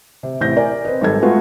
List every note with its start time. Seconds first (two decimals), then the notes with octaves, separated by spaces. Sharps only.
0.23 C3
0.41 A1 C3 G6 A#6
0.57 A#4 D5 G#5
0.85 C4 B4 D#5
1.01 G#1 G3 A4 G#6
1.22 G#3 A3 B3 F4 F#4